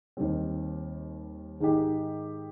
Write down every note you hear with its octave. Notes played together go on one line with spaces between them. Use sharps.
D#2 D#3 G3 C4
G#2 D#3 G#3 D#4 G4